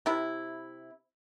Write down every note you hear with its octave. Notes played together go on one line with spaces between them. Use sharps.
C3 E4